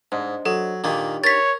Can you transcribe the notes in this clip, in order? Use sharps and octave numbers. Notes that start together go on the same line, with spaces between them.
G#2 D4 C5 D#5
F#3 A4
A#2 D#3 A#3 D4 D#4 G4
A#4 C#5 A6 B6